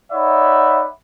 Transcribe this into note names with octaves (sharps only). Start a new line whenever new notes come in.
D#4 C#5 D5 E5 F#5 B5